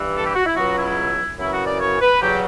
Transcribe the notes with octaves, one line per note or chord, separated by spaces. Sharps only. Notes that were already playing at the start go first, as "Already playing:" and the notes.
Already playing: G2 E3
A4
G4
F#4
E4
C#2 B2 F#3 F#4
E4
F#2 C#3 E3 E4
F#4
D5
C#5
B4
E2 C#3 F#3 G4